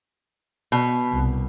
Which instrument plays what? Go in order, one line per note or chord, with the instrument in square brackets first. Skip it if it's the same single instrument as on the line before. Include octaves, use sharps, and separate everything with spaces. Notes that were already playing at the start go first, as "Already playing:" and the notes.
[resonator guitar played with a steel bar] B2
[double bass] C2